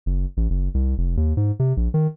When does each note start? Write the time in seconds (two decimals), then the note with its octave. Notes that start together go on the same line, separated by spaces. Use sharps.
0.06 F#1
0.37 A1
0.50 F#1
0.74 C2
0.98 F1
1.17 D#2
1.37 G#2
1.59 C3
1.77 A#1
1.94 D#3